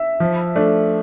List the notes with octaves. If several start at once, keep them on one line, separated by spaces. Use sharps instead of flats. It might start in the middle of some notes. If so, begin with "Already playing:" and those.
Already playing: E5
F3
A3 D4